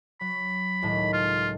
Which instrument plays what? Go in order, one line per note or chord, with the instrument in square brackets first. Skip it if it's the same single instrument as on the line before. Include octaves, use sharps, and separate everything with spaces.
[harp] F#3 [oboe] B5
[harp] C#2 A2 D#3
[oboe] F4